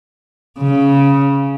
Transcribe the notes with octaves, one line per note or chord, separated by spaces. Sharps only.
C#3